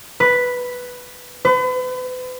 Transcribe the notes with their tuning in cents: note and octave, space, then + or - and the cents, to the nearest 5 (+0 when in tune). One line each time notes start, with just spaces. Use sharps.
B4 +0
B4 +40